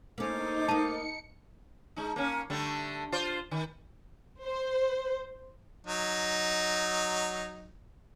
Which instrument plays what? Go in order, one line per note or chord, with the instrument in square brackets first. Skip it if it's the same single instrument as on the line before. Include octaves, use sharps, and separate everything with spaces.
[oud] A#3 C#4 [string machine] D#4 [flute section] A4 C5 D6
[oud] A#3 D#4 [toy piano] A5 [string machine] C#7
[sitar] G#3 D#4
A#3 C#4
D3 G3 A3
F4 C5 D5
D#3
[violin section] C5
[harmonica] F#3 D#4